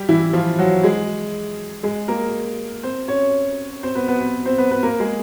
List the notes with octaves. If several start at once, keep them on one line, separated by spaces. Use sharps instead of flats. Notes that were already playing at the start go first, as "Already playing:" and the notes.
Already playing: G3 G4
E3 E4
F3 F4
F#3 F#4
G#3 G#4
G#3 G#4
A#3 A#4
C4 C5
C#4 C#5
C4 C5
B3 B4
B3 B4
C4 C5
C4 C5
B3 B4
B3 B4
A#3 A#4
G#3 G#4